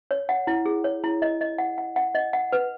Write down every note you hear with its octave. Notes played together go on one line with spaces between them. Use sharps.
C#5
F#5
E4
G#4
C#5
E4
D#5
D#5
F#5
F#5
F#5
D#5
F#5
B4